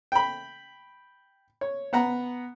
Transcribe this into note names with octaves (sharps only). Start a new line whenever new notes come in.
G5 B5
C#5
B3 F#5 A#5